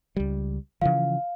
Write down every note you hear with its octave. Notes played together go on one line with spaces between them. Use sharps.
C#2 G3
C#3 E3 F3 F5